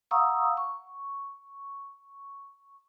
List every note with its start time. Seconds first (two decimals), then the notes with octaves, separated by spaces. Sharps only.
0.11 F5 F#5 A#5 C#6 D#6 E6
0.57 C#6